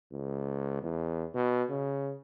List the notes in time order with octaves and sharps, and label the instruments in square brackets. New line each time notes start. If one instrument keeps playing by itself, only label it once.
[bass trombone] C#2
E2
B2
C#3